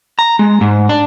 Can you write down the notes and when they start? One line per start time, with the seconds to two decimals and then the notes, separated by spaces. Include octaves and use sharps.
0.19 A#5
0.39 G#3
0.61 G#2
0.89 D4